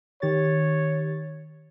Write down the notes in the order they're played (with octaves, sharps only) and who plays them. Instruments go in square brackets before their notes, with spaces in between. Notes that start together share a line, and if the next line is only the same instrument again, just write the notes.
[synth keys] D#3 G4 A6 [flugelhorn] C#5